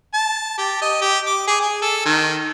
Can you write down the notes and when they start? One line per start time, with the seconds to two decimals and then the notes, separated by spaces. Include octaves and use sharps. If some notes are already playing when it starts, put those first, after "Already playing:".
0.14 A5
0.58 G4
0.82 D#5
1.01 G4
1.26 D6
1.47 G#4
1.61 G#4
1.82 A4
2.05 D#3